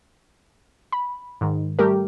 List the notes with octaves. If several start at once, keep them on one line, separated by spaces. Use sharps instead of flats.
B5
G#2 D#3
G3 A3 G4 A#4